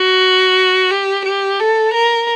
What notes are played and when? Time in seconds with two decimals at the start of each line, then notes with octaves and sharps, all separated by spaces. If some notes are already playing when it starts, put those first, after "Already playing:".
Already playing: F#4
0.91 G4
1.25 G4
1.60 A4
1.94 A#4